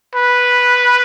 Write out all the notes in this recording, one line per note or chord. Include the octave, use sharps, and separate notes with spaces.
B4